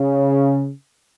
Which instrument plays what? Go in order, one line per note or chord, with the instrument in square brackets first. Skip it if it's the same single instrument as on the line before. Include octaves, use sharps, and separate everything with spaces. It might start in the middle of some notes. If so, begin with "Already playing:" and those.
Already playing: [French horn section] C#3